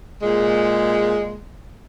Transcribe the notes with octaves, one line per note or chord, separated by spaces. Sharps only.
A#2 G#3